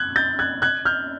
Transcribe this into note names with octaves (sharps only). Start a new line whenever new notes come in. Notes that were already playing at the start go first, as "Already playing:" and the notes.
Already playing: F#6 G#6
G6 A6
F#6 G#6
F#6 G#6
F6 G6